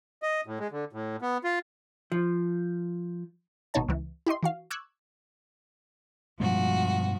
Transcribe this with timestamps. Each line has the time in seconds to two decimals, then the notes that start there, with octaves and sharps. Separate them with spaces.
0.22 D#5
0.46 A2
0.59 G#3
0.72 D3
0.93 A2
1.22 B3
1.44 F4
2.12 F3
3.74 G#1 B2 B3 D#4 C#5 A5
3.88 C#2 E3
4.26 E4 G4 D#5 C6
4.43 E3 F#4 F5
4.71 C#6 D6 E6 F#6 G#6
6.40 G2 B2 F3 G#3 F#4